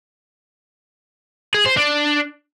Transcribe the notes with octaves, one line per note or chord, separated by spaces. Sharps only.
G#4
C5
D4